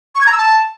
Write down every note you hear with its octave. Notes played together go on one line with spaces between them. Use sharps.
C#6
G#6
A#5
E6
A5